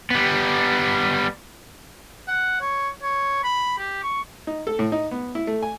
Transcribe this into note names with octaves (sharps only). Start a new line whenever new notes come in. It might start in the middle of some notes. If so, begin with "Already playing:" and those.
G3 B3
F#5
C#5
C#5
B5
G4
C#6
D#4
A4
A2
D#4
B3
E4
A3
G#5